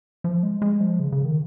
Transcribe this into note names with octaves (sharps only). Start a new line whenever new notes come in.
F3
G#3
G#3
F3
C#3
C#3
D#3